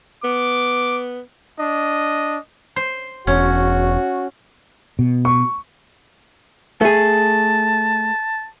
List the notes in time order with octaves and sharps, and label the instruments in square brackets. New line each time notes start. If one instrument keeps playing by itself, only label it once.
[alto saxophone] B3 [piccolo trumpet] D6
[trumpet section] D4 D#5
[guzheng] C5
[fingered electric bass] E1 [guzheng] C#4 [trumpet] F#4
[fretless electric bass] B2
[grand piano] C#6
[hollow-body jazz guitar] A3 G#4 [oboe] A5